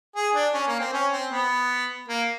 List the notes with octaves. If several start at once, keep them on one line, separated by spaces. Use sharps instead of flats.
G#4
D4
C#4
A#3
C4
C#4
C4
B3
A#3